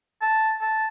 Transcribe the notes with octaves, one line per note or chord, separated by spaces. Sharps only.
A5
A5